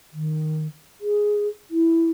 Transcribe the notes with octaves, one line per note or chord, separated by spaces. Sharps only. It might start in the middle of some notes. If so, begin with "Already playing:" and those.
D#3
G#4
E4